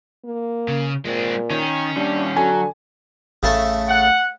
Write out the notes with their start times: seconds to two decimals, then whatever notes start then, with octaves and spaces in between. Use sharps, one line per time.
0.25 A#3
0.68 C#3
1.05 A#2 G#3 C4
1.50 D#3 C#4
1.97 D#2 G3 D4
2.36 D3 F#3 G#5
3.43 A1 C#3 A3 A5
3.88 F#5